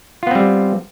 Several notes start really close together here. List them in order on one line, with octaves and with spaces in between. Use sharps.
F4 B3 C4 G3